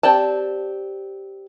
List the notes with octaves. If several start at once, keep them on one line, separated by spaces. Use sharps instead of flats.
C4 G4 D5 A5